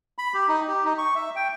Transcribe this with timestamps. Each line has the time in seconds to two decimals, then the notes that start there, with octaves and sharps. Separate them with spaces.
0.18 B5
0.34 G4
0.48 D#4
0.68 G4
0.85 D#4
0.98 C#6
1.15 E5
1.36 G5